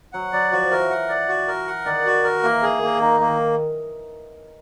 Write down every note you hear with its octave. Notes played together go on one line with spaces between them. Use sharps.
F#3 F#5
F#3 D5
F3 F#4
E3 A#4
F#5
D5
F#4
A#4
F#5
D#3 D5
F#4
A#4
E3 A#3
D#3 G#4
D#3 A#3
D#3 D#4
A#3
D#3